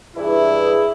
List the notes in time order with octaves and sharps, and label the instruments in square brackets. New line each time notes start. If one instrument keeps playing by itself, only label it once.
[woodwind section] G2 E3 [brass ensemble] E4 [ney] G#4